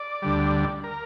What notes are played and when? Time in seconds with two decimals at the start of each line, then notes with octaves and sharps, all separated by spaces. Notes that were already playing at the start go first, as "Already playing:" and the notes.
Already playing: D5
0.22 D2 D3 G3
0.84 A#4